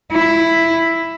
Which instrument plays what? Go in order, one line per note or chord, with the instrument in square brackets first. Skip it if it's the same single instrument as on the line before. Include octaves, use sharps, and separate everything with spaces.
[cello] E4